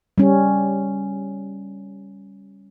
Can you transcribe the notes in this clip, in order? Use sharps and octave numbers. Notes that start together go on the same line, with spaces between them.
G3 C#4